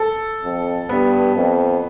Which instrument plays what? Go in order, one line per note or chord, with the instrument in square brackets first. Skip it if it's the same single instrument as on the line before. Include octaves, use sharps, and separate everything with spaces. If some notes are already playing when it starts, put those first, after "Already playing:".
Already playing: [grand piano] A4
[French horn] F2
[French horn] G2 [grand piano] B3
[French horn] F2